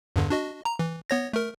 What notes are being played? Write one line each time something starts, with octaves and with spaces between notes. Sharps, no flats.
E2 G2 D3
D4 F#4 D#5
A#5
E3
B3 C#5 A#6
A3 A#4